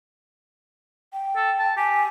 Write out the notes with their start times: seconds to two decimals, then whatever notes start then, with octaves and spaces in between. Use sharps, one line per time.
1.13 G5
1.36 A4
1.59 A5
1.77 G4 G#5